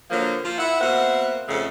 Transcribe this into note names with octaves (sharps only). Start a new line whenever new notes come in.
D3 F3 F#3 A#3
F3 A#3 F4
E4 F#5
B2 A#3 C4 E5 F#5
F2 G#2 C#3 A3